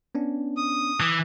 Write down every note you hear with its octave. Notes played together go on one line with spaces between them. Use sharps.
B3 C#4 D4
D#6
E3 D6 E6 F#6